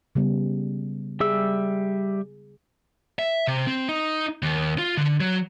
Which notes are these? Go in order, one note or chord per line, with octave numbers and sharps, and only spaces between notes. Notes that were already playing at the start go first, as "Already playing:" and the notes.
C#3 G3 B3
G3 G#4 E5 E6
E5
C3
C4
D#4
D#2
F4
D3
F#3